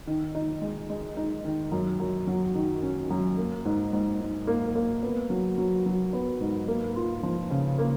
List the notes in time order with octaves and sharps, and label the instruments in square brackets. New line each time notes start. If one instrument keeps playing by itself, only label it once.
[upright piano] D#3
D#4
G#3
G#3
D#4
D#3
F#2
F#2
F#3
D#3
C#4
F#2
A#3
G#2
G#2
G#2
A#3
A#3
B3
F#3
F#3
F#3
B3
G#2
A#3
F4
F3
C#3
A#3